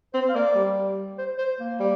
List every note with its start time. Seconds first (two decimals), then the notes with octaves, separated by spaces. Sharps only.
0.14 C4 C5
0.29 F5
0.35 A#3 D5
0.55 G3
1.18 C5
1.38 C5
1.60 A#3
1.79 G3